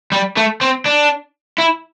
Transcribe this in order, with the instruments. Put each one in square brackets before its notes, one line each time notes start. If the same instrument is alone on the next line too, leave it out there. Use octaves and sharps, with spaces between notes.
[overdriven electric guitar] G3
A3
C4
D4
E4